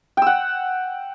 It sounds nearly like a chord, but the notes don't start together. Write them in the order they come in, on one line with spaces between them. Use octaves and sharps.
G5 E6 F#5